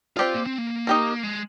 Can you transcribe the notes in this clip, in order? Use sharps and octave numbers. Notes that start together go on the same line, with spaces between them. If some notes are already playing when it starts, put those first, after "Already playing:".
C4 F4 G4 D5 F5
A#3
C4
A#3
D#4 G4 A#4
G#3